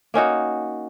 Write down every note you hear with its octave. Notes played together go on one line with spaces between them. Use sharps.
A#3 C#4 D#4 F#4